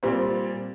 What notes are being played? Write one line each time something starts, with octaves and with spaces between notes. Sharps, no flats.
A#2 G3 C4